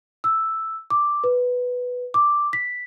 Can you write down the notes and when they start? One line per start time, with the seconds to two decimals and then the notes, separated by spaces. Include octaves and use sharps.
0.24 E6
0.90 D6
1.24 B4
2.14 D6
2.53 B6